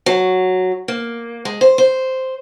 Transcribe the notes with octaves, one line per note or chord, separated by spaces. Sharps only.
F#3
A#3
G#3
C5
C5